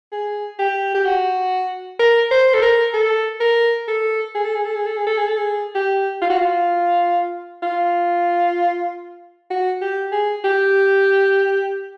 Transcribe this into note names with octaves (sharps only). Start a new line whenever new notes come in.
G#4
G4
G4
F#4
A#4
C5
A4
A#4
A4
A#4
A4
G#4
A4
G#4
A4
G#4
A4
G#4
A4
G#4
A4
G#4
G4
F4
F#4
F4
F4
F#4
G4
G#4
G4